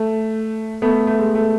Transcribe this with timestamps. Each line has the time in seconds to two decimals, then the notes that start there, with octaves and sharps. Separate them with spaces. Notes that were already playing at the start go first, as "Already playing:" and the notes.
Already playing: A3
0.82 A3 B3
1.07 A3
1.19 G#3
1.35 A3